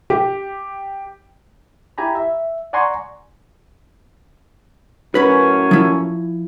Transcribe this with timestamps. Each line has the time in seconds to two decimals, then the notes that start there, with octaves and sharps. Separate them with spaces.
0.10 G4
1.98 E4 G4 G#5 A#5 B5
2.15 E5
2.73 D5 F#5 G#5 A#5 C6 C#6
5.15 F#2 A2 C#4 B4 B5
5.71 F3 E4